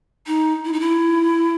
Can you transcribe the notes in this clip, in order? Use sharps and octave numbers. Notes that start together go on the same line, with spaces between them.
D#4
E4
D#4
E4